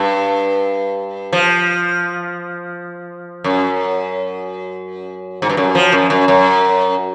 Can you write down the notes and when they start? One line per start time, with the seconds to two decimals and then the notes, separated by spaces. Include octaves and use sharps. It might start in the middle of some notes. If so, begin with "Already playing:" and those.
Already playing: G2
1.33 F3
3.44 F#2
5.42 G#2
5.49 G2
5.57 F#2
5.75 F3
5.92 F#2
6.10 F#2
6.28 F#2